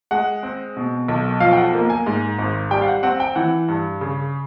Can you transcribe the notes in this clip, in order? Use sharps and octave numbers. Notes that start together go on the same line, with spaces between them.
G#3 F#5
C4
B2
B1
F3 F5
G5
F#5
A#3
G#5
G#2
G#1
G3 G5
F5
F#5
C4 F#5
G5
E3 F#5
G2
C#3